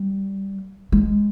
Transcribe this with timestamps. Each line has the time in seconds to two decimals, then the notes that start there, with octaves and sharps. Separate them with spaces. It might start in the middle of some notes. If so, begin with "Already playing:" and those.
Already playing: G3
0.92 G#3